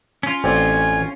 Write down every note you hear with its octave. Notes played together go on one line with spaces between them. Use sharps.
C#4 F4
A1 C4 D5 G#5